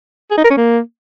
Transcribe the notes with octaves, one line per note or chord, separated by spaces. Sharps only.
G#4
D#4
A#4
C#4
A#3